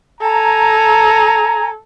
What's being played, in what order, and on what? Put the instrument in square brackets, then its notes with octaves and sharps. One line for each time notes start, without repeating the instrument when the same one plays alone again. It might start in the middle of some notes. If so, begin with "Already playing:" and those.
[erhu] A4 [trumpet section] G#5 A#5